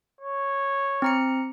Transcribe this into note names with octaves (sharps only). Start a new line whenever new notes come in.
C#5
C4 A#5 C#7